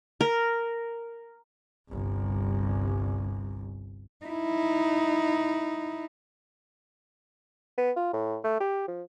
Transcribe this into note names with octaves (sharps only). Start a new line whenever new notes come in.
A#4
G1 C2
D#4 E4
B3
F4
A2
A3
G4
F3